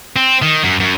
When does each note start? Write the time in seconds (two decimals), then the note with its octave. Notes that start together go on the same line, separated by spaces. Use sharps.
0.16 C4
0.42 D#3
0.64 F#2
0.80 F#2